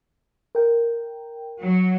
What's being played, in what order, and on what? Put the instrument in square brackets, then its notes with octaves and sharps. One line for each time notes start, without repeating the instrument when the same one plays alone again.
[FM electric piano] A#4 G5
[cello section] F#3